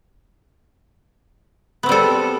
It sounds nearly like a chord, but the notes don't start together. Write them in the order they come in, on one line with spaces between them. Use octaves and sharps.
B3 C4 G3 A4